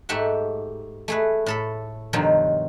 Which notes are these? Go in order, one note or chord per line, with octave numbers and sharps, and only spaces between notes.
G#2 A3 G4 E5 F#5
A3 G#4 B4
A2 A4 B5
G2 B2 D#3 F3 F#3